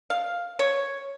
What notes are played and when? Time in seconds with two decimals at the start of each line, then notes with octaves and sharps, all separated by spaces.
0.10 F5
0.59 C#5